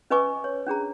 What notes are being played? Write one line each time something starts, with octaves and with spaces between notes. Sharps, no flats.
C#4 B4 D#5 G#5 C#6 D6
C#5
C#4 D4 G#4 A#5